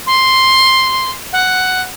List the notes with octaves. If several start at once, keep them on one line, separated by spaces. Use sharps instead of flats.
C6
F#5